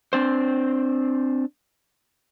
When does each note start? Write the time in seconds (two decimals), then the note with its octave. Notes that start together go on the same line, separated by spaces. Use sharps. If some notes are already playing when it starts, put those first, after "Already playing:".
0.13 C4 D4 C5